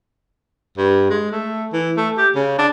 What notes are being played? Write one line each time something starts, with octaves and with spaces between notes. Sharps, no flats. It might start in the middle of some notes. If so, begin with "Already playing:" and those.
G2
G#3
A3
E3
A3
G4
C#3
D4